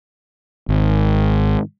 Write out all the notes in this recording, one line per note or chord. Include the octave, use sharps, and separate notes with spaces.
G#1